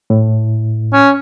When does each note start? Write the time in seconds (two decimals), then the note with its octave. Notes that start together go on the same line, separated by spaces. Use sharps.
0.10 A2
0.93 C#4